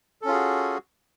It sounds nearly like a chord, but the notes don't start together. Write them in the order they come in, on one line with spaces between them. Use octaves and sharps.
A4 C#4 F4 G#4 F#4